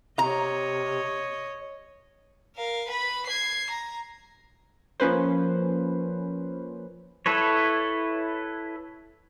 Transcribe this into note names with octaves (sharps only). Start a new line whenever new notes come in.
C3 C#5 D#5 A#5
A#4 F5
B4 B5
G#6 C7
A#5
F3 A#3 C#4 B4 C5
E4 A4 B4 C#5